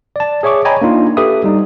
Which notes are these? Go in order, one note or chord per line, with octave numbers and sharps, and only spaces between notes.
D5 A5
G#4 C#5 E5 C#6 D6
C#5 D#5 G5 G#5 A#5 B5
A#3 D4 D#4 F4
G4 A4 B4 E5 D#6
G3 D#4